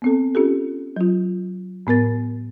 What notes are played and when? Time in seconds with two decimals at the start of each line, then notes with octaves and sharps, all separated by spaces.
0.02 B3 C4 A4
0.35 C#4 F4 G4 A4
0.96 F#3 F4
1.87 A2 B3 A#4 A6